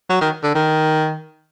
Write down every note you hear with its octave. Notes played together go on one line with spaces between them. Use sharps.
F#3
D#3
D3
D#3